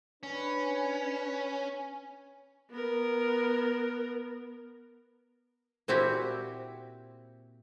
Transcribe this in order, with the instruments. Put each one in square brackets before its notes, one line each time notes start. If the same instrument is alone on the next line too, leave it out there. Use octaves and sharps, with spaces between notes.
[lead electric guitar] C#4 [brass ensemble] D4 B4
[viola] B3 A#4
[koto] A#2 C4 E4 F#4 G4